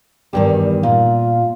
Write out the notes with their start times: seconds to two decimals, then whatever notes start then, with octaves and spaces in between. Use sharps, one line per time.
0.33 E2 G2 D#3 G4
0.57 G3
0.83 A#2 F4